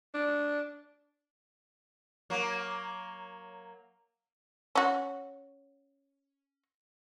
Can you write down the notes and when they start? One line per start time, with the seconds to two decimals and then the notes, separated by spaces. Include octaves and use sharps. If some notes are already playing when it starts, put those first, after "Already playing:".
0.14 D4
2.30 F#3 A#3
4.75 C#4 F#4